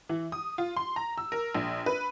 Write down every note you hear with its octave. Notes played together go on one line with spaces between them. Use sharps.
E3
D#6
F4
C6
A#5
E6
A#4
A#1
B4